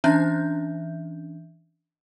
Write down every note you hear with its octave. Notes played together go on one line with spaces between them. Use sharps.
E3 C#4 D4 E5 G6